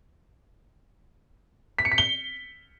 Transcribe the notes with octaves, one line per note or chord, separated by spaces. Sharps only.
B6
C#7
B6
G7